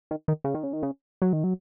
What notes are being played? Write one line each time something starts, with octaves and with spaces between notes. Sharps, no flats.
D#3
D#3
C#3
D#3
C#3
D#3
C#3
F#3
D#3
F#3